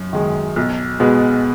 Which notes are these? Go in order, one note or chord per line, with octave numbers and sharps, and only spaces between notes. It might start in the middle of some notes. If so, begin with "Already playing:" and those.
Already playing: F#2
D#3 G#3
B1
B2 G#3 B3